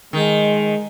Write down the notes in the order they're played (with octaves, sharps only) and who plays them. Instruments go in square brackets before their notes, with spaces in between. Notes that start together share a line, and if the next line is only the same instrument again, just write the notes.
[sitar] D#3 [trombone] G#3